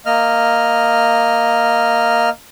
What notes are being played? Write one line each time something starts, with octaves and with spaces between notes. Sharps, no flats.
A#3 D#5 F6